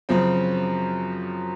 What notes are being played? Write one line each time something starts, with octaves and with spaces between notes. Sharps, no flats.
F#2 C#3 F3 C4